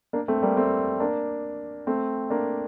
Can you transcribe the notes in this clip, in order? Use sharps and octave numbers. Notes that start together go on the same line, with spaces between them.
A#3 D4
A3 C4
G3 A#3
A3 C4
A#3 D4
A3 C4
A#3 D4